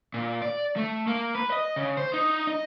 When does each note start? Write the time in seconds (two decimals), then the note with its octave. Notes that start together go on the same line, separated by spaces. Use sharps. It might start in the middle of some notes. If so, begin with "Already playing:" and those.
0.14 A#2
0.42 D5
0.76 A3
1.07 A#3
1.35 B4
1.52 D#5
1.76 C#3
1.97 C5
2.14 D#4
2.47 D#5